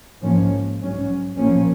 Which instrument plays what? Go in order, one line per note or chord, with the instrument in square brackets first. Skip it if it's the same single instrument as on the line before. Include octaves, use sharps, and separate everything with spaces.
[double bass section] G#2 F3 A#3 C#4
G#2 F#3 C#4
A#2 F3 A#3 C#4